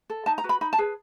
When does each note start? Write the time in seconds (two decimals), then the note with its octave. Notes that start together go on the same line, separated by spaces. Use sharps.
0.10 A4
0.26 D#4 A5
0.38 A#5
0.44 F#4 B4
0.49 B5
0.61 D#4 B5
0.73 A5
0.78 G#4 B4